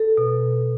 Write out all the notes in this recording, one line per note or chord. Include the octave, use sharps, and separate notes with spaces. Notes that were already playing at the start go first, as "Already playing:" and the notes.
Already playing: A4
B2